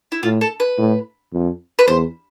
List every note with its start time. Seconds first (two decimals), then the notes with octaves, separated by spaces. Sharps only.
0.12 E4
0.23 A2 F4
0.41 A4
0.60 B4
0.78 A2
1.33 F2
1.79 B4
1.88 E2 C5